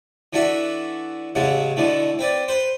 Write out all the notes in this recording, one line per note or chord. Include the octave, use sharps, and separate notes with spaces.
E3 A3 D4 F#4 E5
A1 C#3 G#3 A3 F#5
B2 D3 E3 A3
C4 B4 D5
B4 C5